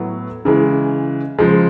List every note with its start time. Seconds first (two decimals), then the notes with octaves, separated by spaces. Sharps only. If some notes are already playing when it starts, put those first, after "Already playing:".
Already playing: A2 F#3 B3 E4
0.45 C#3 E3 G#3
1.39 C#3 F3 G#3